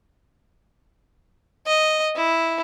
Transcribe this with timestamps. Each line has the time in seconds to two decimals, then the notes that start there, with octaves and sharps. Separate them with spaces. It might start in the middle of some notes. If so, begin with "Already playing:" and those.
1.67 D#5
2.16 E4